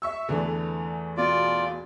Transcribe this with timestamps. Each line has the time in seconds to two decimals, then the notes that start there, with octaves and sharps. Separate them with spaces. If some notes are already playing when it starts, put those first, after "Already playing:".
0.02 E5 C#6 E6
0.29 E2 D3 E3 A3
1.17 B2 F4 D5